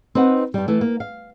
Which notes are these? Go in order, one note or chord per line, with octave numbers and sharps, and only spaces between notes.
C4 D#4 B4 F#5
G2 G3
E3 A3
A#3
F5